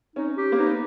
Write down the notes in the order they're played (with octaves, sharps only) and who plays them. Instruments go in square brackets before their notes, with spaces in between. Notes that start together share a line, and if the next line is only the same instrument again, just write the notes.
[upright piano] C#4 [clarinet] D#4
[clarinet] G4
[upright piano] A#3
[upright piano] B3 [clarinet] D#4